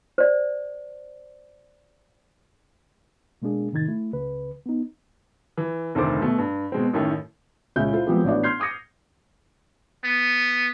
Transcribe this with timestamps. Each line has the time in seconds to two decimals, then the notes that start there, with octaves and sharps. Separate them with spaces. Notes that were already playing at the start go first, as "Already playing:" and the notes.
0.18 C5 D5
3.42 B2 G#3 A#3 D4 G#4
3.72 A2 C3 D#3 D#4 G#6 A6
3.88 A3 E4
4.13 C#2 C#3 B4
4.66 B3 D#4
5.57 E3
5.95 F1 D2 D#3 A4 C5 D6
6.21 B2 A3
6.38 G2
6.72 B2 G#3 C4
6.93 A1 F#2 A2 D#3 A3 G5
7.76 C#2 A#2 G#3 C#4 E5 G6
7.93 E4 F4 A4 C5
8.07 F3 F#3 G#3 B3 C4 G4
8.24 A1 B3 D4 F#4 D5
8.43 C6 F6 G6 G#6 C7
8.60 D6 D#6 G#6 A#6 C#7
10.04 B3